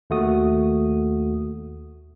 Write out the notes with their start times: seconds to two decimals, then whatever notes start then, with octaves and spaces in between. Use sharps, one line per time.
0.10 D#2 A3 F#4 D#6